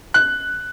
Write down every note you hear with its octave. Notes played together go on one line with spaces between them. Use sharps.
F#6